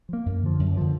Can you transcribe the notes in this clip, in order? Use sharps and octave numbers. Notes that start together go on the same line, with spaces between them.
F3 A#3
F#2
D3 F3
F#2
D3 F3